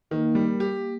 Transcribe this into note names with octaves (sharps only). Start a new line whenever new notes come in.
D#3 A#3
G3
G4